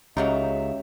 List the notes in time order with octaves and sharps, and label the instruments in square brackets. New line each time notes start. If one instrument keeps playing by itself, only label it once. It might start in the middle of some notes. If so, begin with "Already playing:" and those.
[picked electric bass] C#2 [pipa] F#3 A#3 D#4 [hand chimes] C#4 G4 C#5 [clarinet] E5